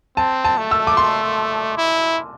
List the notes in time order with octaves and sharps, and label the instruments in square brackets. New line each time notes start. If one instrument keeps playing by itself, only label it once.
[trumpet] C4 [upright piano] A5
[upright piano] A5
[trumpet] A3
[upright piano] E6
D6
C6
[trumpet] E4